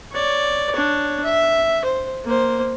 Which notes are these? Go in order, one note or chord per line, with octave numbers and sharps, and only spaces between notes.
C#5 D5
D4 C#5
E5
C5
A#3 C5